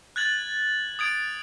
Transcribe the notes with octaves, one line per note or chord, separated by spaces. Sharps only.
F#6 G#6 A6 F#7
D#6 G#6 D7